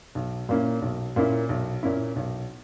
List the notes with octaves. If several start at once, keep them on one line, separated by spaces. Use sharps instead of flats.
B1
A#2 A#3 C#4 E4
B1
A#2 A#3 C#4 E4
B1
A#2 A#3 C#4 E4
B1